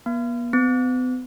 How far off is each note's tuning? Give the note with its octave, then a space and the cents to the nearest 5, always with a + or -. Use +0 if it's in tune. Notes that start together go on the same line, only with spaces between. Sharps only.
B3 -45
B3 +45